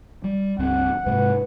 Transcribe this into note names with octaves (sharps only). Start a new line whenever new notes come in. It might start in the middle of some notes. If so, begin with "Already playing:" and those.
G3
C#2 G2 C4 F#5
G#2 C3 G#3 B4